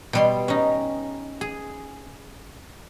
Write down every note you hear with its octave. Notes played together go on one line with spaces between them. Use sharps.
B2 G3 C6
C#4 D#4
G#4